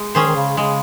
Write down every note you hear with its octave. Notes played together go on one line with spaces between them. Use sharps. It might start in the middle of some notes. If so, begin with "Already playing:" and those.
Already playing: G#3
D#3 C#4 G#4 C5
D#3
C#3
C#3 G#3